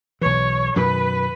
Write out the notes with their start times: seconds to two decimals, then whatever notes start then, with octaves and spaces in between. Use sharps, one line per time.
0.21 B1 E3 C#5
0.76 F#2 B2 D#3 B4